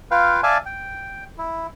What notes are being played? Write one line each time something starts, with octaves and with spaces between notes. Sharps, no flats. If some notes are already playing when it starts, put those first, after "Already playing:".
F4 B4 F5 G5
D5 E5 F5 G#5 A5
G5
E4